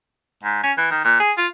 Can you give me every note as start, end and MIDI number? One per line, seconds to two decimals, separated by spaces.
0.43 0.60 44
0.63 0.72 61
0.78 0.87 52
0.91 1.04 51
1.05 1.19 46
1.20 1.32 68
1.38 1.47 65